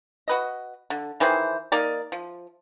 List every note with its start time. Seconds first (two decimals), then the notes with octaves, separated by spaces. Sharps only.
0.28 F#4 B4 D#5
0.90 D3
1.20 D#3 E3 G#4 C5
1.72 A#3 D#4 A#4 D5
2.12 F3